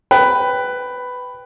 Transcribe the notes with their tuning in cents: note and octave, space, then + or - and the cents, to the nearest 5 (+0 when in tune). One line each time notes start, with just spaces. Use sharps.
B4 +10 G5 +0